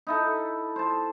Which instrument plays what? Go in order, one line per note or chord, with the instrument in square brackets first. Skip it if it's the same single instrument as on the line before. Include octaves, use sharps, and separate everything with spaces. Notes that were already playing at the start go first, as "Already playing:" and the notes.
[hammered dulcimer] D#4 E4 A4
C5 A5